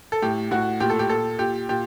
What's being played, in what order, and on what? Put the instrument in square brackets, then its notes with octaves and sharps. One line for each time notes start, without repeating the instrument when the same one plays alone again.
[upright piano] A4
A2 G4
A2 F#4
A#2 G4
A4
G4
A#2 A4
A#2 G4
A#2 G4